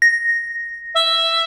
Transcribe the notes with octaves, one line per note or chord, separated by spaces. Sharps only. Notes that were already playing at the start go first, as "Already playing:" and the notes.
A#6
E5